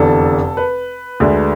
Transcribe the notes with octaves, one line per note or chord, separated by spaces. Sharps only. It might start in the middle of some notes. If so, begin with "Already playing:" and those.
Already playing: F1 E2 D3 A4
B4
D2 D3 G#3